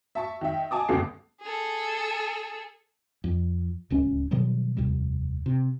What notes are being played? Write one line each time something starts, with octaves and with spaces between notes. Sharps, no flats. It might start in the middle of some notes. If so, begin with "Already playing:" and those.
E5 A5 C#6
D#3 E5
D#5 G#5 A5 D6 D#6
G1 C#2 G2 B2 A4 C7
G#4 A4
F2
D1 C#2 C#4
B2 D#3 F#3 G3
F1 D#2 C3 G3
C3